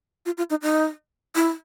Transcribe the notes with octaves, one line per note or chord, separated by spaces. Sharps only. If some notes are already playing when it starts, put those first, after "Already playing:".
F4
F4
D#4
D#4
E4